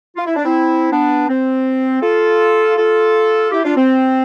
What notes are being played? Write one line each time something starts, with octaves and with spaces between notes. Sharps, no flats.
F4
E4
D4
C4 E4
B3 D4
C4
F4 A4
F4 A4
E4 G4
D4 F4
C4